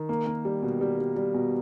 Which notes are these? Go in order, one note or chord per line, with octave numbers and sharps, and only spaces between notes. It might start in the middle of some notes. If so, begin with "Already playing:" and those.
Already playing: D#3
A#3
A#3
G3
B2
G3
G3
G3
B2